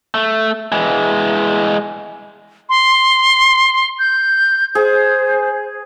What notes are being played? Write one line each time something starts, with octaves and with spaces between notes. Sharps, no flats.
A3
E3 G#3
C6
G6
G#4 C5